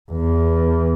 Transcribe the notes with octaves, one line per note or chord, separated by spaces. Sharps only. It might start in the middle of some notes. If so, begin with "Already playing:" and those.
E2